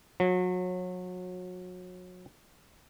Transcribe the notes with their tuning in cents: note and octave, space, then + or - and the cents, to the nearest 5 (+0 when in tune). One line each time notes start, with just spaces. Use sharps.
F#3 -30